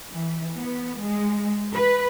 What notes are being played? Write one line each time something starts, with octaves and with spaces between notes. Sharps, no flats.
E3
B3
G#3
B4